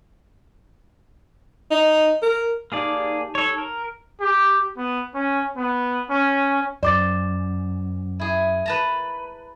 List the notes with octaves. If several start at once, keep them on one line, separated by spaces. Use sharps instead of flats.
D#4
A#4
A#3 D#4 G4 G#4 D5 A5
A4 C#5
A#4
G4
B3
C#4
B3
C#4
F#2 C5 D5 D6 A6
E4 G#4
B4 A5 A#5